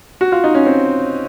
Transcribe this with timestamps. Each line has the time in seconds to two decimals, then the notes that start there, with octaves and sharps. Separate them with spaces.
0.21 F#4
0.32 F4
0.44 D#4
0.55 C#4
0.66 C4